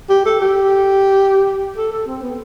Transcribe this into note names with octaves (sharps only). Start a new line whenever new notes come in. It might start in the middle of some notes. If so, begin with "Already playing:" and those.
G4
A4
G4
A4
A4
C4
B3